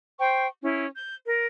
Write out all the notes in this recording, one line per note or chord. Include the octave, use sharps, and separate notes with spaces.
C5 G5 C#6
C#4 E4
G6
A#4